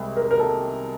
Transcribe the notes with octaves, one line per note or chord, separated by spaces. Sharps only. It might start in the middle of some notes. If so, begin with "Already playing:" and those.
Already playing: C2 C3 G#3
A#4
A#4
A4